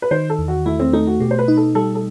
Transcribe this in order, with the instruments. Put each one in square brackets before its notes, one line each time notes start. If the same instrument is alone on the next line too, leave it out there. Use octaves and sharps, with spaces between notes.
[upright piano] B4
[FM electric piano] D#3 [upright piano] C5
[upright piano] A4
[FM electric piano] E2
[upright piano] F#4
[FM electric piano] A3 [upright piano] E4
[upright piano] C4
[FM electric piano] A3 [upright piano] D#4
[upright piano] F#4
[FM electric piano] B2 [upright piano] G4
[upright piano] C5
B4
[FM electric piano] D#4
[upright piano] A4
[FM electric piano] G3 [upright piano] A4
[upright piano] A4